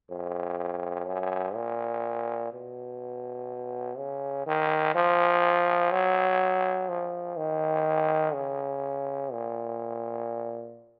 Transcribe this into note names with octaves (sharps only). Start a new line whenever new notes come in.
F2
F#2
A#2
B2
C#3
D#3
F3
F#3
F3
D#3
C#3
A#2